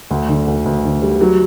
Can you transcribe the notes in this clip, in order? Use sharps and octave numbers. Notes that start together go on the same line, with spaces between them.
D2
D3
D2
D2
D3
G3
F#3